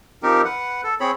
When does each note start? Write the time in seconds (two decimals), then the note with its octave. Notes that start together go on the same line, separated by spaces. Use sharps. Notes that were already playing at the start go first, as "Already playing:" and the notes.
0.23 F3 C4 D#4 G4 A#4
0.45 B4 F#5
0.84 A4
1.00 C4 G#4 C#5 B5